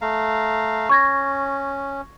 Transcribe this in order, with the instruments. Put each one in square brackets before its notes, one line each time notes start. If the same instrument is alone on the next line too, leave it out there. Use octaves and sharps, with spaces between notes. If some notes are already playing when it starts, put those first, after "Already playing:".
[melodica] A3 F5 A#5
[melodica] C#4 [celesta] C#6 G#6 A#6